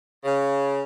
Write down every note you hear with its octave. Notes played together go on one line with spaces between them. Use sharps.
C#3